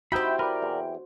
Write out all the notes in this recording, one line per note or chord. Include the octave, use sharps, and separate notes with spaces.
D#4 E4 F#4 G4 C5 E5 G5 B5
A#4 B4 D5
E2